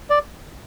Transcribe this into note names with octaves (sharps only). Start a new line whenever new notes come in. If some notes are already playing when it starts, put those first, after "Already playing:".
D5